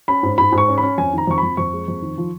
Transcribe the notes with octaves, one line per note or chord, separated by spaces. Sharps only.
C#4 B5
G#2
G#2 B5
G#2
C#6
C#4
B5
C#4
F2 G#5
D#3 A#5
F2 C#6
B5
F2
F2 C#6
G#3
F2
D#3
F3